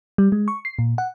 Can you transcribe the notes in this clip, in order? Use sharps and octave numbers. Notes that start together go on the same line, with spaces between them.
G3
G#3
C#6
C7
A#2
F#5